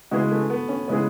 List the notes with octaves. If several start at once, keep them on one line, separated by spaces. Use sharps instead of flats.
C#3 G#3 B3 E4 F#4 G#4
A3
B3
C#4
C#3 G#3 B3 C#4 E4 G#4